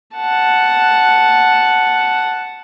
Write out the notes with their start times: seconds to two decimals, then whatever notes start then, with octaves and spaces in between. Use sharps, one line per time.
0.16 F#5 A5